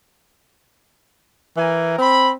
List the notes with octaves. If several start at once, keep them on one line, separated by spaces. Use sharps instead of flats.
E3 A#4 G#5
C4 B5